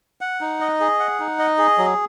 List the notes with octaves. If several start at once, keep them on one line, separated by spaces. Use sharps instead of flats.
F#5
D#4
D#5
G#4
F#5
D#4
D#5
G#4
F#3